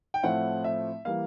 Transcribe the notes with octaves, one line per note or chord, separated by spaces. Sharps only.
G5
A2 F3 A3 C4 E4 F#5
E5
E3 G3 A#3 F5